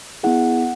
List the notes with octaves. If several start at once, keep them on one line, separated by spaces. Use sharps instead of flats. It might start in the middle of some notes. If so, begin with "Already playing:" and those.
B3 E4 G#4 F#5